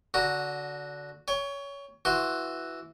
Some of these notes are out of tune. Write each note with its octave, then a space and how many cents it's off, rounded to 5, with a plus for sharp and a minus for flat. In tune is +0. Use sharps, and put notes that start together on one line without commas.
D3 -20 F#4 -5 A#5 +0
C#5 +20 G5 +40
E3 +0 F#4 +0 C6 +0